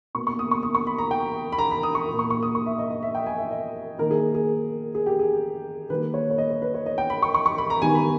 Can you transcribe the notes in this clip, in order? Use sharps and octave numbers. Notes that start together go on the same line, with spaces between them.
B2 A#3 C#6
C#6
D#6
C#6
D#6
C#6
B5
A#5
G5
B5
A#5
B5
D#6
C#6
A#2 A#3
C#6
C#6
D#6
C#6
E5
D#5
D#5
E5
G5
G#5
E5
D#5
D#3 A#3 A#4
G#4
G#4
G#4
G4
G#4
D#3 G3 A#3 B4
C#5
C#5
D#5
C#5
B4
C#5
D#5
G5
B5
C#6
C#6
C#6
B5
A#5
D#3 G3 B3 G#5
B5